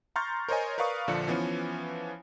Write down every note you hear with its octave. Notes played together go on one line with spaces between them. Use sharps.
A#5 C6 C#6 F6 G6 A6
A#4 C5 C#5 D#5 G#5
A#4 B4 D5 F5 C#6 D#6
A#1 D3 F3 D4 C#7
E3 F3 B3 C#4